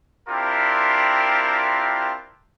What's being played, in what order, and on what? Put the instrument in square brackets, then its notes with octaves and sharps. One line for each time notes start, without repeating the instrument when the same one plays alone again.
[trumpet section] C4 D4 E4 F4 G4 A#4